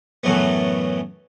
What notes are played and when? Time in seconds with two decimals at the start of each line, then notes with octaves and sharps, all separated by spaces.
0.23 F#2 A2 E3 F#3 A3 B3